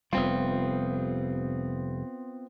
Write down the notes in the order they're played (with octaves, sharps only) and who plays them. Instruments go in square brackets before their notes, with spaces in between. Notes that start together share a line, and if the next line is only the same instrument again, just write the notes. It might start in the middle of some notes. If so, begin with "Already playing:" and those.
[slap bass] F1 G3 [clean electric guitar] B3 C4 F4